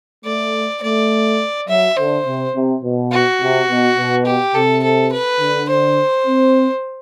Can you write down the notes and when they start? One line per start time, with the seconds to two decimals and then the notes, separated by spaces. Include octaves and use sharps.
0.25 A3 D5
0.83 A3 D5
1.68 F#3 E5
1.97 D3 C5
2.26 C3
2.54 C3
2.83 B2
3.12 F#4
3.41 C3
3.69 B2
3.97 B2
4.26 G4
4.55 C3 A4
4.83 A4
5.12 B4
5.40 D3
5.69 C5
6.27 C4